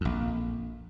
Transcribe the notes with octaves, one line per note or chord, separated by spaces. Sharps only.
A#1 F2